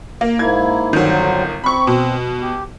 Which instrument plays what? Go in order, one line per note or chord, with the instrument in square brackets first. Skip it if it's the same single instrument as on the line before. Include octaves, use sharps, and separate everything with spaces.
[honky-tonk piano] A#3
[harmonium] G#2 A#3 E4 [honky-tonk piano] G#6
[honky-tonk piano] G1 D#3 [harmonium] D3 F#3 C4
[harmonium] C4 [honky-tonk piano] B5 C#6
[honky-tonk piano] B2
[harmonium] G4